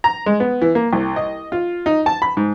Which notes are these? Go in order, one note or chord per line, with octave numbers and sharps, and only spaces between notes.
A#5
G#3
B3
E3
A#3
C2
D#5
F4
D#4
A5
B5
G#2